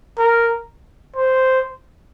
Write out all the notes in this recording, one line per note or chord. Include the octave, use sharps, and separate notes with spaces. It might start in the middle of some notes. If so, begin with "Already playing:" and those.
A#4
C5